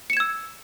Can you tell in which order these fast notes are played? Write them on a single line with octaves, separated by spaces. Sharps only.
C#7 E7 G#6 E6